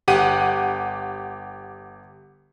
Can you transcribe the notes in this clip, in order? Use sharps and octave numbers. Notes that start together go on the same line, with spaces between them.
G1 G4 F#5 D#7